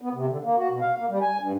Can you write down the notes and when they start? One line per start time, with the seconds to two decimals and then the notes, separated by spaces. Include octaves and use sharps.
0.01 B3
0.13 C3
0.29 D3
0.43 A#3
0.56 F#4
0.69 B2
0.81 F5
0.97 A#3
1.09 G3
1.22 G#5
1.39 G2